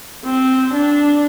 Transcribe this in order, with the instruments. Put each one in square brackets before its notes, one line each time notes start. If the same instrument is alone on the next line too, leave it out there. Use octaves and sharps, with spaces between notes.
[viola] C4
D4